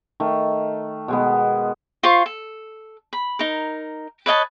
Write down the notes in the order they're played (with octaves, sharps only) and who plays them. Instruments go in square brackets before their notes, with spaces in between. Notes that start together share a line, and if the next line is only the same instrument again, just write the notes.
[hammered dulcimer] D#3 A3
B2 G#3 B3
[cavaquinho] F4 C5 F5 C#6
A4
B5
D#4 A#4
B4 C#5 D#5 A5